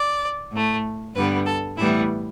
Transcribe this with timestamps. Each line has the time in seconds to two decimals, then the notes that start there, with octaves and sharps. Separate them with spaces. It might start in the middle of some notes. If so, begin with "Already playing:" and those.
Already playing: D5
0.52 A2 A3
1.15 G2 D3 G3 B3 B4
1.46 A4
1.78 A2 E3 G3 B3 E4